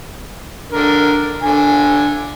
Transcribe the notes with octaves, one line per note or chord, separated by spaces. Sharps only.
D3 A#4
D3 G#5